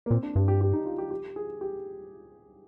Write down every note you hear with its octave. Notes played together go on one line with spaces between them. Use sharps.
A#3
A#2 C4
D4
G2 G4
G4
G4
D#4
F4
G4
G4
G#4
G4